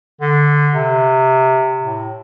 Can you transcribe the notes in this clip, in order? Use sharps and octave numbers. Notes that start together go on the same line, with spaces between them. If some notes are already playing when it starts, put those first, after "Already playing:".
D3
C3
A2